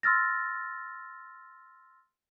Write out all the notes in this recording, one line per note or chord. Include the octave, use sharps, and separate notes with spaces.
C6 E6 F6 A6 A#6